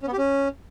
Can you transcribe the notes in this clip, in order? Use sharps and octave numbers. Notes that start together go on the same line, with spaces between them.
C#4
B3
G4
C#4